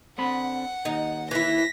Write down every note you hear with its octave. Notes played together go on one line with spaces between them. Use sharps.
D3 C4 F#5 B5
D#2 D#4
E3 E4 A#6 B6